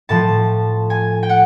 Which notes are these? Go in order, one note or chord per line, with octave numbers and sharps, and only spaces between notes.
A2 F3 A5
G#5
G5
F#5